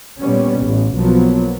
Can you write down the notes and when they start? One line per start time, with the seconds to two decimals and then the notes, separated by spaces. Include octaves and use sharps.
0.20 A#2 G3 B3 C#4
0.61 A1
0.95 B1 F3 F#3 A#3 B3